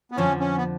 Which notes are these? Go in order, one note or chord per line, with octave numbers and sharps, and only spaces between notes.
B3
F2 D3 F3 C#4
C#4
B3